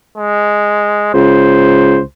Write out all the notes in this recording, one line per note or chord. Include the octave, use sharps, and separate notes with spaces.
G#3
C#2 C5